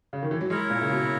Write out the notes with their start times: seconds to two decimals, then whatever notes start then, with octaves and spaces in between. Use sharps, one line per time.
0.13 C#3
0.23 D#3
0.31 E3
0.41 F#3
0.50 G#3 E4 A#4 C#5
0.70 A#2
0.81 C#3
0.91 B2